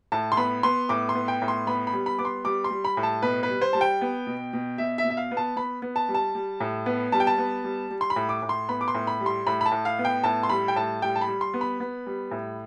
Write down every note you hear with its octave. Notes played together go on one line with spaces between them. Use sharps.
A2 A5
C6
B3 B5
B3 C6
A2 D6
C6
B3
G5
A2
C6
B3 B5
B5
G3
B5
B3 D6
C6
G3 D6
C6
G3
B5
A2
A5
B2 B4
B4
G3
C5
G3 A5
G5
B3
B2
B2
B2 E5
E5
B2
E5
F5
B3
A5
B3 B5
B3
A5
G3
A5
G3
A2
B3
G3 A5
G5
A5
B3
G3
G3
C6
B5
A2
D6
A2
C6
B3 B5
D6
C6
A2
B5
G3
C6
A2 B5
B5
A5
A2
F5
B3
G5
A2 A5
C6
G3 B5
G5
A2 A5
G3 G5
A5
B5
G3
C6
B3
B5
B3
G3
A2